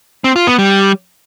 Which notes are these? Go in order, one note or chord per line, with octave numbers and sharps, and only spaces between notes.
C4
F4
B3
G3